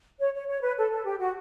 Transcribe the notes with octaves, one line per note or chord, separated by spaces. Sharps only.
C#5
C#5
C#5
B4
A4
A4
G4
F#4